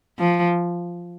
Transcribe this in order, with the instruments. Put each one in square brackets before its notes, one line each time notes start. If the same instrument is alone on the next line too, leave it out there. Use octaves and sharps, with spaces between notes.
[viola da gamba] F3